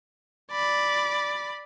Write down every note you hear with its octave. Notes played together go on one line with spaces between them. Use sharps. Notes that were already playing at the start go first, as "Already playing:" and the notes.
D5 B5